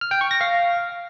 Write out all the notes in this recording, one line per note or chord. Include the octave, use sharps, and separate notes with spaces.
F6
G5
C#6
A#6
F5